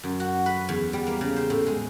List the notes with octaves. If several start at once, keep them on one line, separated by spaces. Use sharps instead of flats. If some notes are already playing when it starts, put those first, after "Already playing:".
F#2
F#4
B4
E2
G3
A#3
C#3
C5
A2
G#3